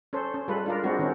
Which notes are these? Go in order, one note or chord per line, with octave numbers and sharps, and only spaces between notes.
C#4 A4 C5
C#4
G3 G#3 F4 A4 B4
D4 F4 A#4
G#3 C4 D4 F#4
D#3 C4 C#4